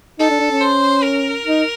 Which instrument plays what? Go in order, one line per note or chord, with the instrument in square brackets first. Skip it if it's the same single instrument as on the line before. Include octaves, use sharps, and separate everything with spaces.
[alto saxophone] D#4 [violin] A4
[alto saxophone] D4
D4
C#4
[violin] C5
A#4
[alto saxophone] D#4